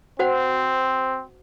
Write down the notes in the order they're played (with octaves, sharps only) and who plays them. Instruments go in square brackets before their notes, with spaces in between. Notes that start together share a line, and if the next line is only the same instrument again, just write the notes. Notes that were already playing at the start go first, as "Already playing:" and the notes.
[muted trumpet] C4 [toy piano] F#4 C5 F#5